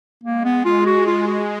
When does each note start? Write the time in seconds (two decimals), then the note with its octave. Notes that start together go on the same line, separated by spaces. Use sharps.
0.23 G#3 A#3
0.44 B3
0.65 F4
0.86 F#4
1.07 F4
1.27 F#4